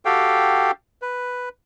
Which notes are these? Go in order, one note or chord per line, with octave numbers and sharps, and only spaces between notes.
F#4 G4 A4 F5 G5
B4